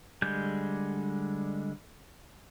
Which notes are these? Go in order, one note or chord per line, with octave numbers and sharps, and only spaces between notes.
D3 G3 G#3 G6